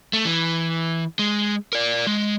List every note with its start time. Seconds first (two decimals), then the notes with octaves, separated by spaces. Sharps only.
0.13 A3
0.25 E3
1.19 G#3
1.73 A#4 D5
2.07 G#3